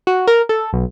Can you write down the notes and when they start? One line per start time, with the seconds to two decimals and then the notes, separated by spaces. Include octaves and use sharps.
0.07 F#4
0.27 A#4
0.49 A4
0.73 B1